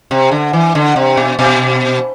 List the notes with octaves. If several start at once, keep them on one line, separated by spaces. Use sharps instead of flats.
C3
D3
E3
D3
C3
B2
B2